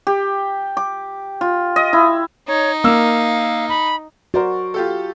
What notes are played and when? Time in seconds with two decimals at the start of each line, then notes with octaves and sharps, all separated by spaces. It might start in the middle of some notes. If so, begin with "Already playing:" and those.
0.07 G4
0.77 D6
1.41 F4
1.76 D#5
1.93 E4
2.48 D#4 C#5
2.84 A#3 F5 E6
3.69 B5
4.34 F#4 A#4 C5 D5
4.74 F4 G4 A4